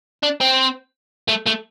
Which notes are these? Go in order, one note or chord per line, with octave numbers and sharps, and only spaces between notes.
D4
C4
A3
A3